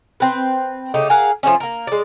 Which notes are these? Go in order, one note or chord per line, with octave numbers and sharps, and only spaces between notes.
C4 B4
C#3 A3 D#4 G4
G#4 A#4 F5 F#5
F3 G3 A3 C#4
A#3 A#4
G#3 D5